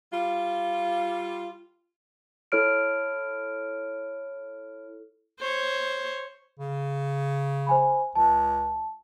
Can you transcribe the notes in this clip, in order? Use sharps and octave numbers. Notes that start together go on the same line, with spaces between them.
G3 F4
E4 A4 C#5 F6 D7
C5 C#5
C#3
C5 G#5 B5
C#2 A5